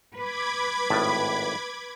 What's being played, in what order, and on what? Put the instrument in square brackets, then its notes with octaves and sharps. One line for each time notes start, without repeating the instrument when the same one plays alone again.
[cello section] B4 [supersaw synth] B5 D6 G#6
[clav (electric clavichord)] G#1 A2 A5